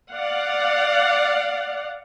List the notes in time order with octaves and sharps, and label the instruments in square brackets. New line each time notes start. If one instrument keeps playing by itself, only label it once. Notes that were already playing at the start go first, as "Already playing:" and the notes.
[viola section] D5 F5 F#5